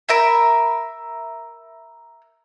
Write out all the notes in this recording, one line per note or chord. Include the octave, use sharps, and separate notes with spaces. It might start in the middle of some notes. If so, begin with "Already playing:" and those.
A#4 E5 B5